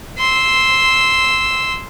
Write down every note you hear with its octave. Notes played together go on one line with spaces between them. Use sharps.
C6 E6